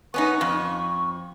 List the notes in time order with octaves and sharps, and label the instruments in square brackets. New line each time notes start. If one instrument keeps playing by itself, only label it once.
[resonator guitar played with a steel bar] B3 C#4 D#4 [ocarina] C#6
[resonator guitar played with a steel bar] F2